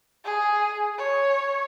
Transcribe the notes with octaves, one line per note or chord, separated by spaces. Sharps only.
G#4
C#5